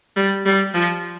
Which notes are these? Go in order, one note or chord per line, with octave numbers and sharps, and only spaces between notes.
G3
G3
F3